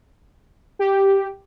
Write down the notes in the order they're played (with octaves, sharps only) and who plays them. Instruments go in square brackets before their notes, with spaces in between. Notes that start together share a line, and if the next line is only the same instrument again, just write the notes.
[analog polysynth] G4